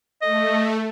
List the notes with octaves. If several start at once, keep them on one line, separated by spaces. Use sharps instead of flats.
A3 D#5